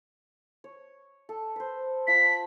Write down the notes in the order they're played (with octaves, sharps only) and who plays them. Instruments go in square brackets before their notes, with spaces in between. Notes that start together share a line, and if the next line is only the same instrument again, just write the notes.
[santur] C#5
A4
B4 C5
[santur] F4 A5 [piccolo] B6